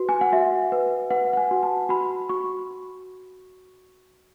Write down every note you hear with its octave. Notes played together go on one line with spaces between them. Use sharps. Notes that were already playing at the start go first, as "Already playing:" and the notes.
Already playing: F#4 B4
G#5
F#5
F#4 E5
B4
B4 F#5
F#5
G#5
F#4
A5
F#4 B5
F#4 C#6